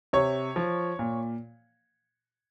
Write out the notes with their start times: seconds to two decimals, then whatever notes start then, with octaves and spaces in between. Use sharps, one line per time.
0.13 C3 C#5
0.56 F3
0.99 A#2